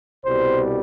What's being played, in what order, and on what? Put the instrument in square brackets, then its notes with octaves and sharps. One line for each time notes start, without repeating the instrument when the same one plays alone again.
[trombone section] C2 B2 G3 C5